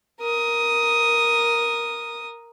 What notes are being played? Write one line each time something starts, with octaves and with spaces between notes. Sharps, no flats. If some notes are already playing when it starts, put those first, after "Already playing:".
A#4 D#6